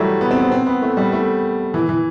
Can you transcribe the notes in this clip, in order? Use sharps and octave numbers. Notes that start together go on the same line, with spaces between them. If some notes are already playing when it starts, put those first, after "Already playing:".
Already playing: E3 F#3 G3 A3
B3
C4
B3
C4
B3
A3
G3
A3
E3
E3